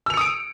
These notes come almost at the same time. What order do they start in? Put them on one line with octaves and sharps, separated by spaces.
E6 F7 C#7 D#6 D7